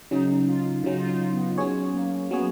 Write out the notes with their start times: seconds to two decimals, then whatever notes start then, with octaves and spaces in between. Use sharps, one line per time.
0.11 C#3 F#3 C#4 D#4
0.48 F4
0.84 C#3 F#3 C#4 D#4
0.98 F4
1.09 D#4
1.33 B3
1.58 F#3 C#4 G#4 C#5
1.94 A#3
2.31 F#3 B3 C#4 G#4 C#5